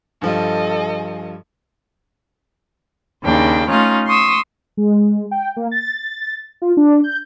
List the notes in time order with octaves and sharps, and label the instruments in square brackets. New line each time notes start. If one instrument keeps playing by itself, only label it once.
[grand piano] G2 F3 G3 [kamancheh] A4 D#5
[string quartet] D#2 C#3 D4 G5
A3 C#4 D#4 F4
C6 C#6 D#6 E6
[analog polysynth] G#3
G5
A#3
A6
F4
D4
G6